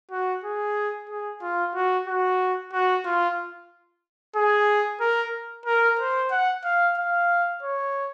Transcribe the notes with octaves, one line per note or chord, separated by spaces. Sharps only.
F#4
G#4
G#4
F4
F#4
F#4
F#4
F4
G#4
A#4
A#4
C5
F#5
F5
F5
C#5